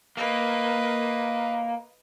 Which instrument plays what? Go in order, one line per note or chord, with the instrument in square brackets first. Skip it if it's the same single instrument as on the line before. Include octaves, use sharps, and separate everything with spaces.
[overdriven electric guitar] A#3 [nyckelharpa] B4 D#5